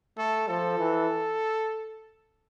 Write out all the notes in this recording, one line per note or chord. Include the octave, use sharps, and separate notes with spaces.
A3 A4
F3 A4
E3